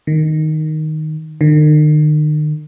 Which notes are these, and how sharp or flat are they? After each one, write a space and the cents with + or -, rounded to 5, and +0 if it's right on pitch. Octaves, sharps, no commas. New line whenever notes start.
D#3 -5
D#3 -40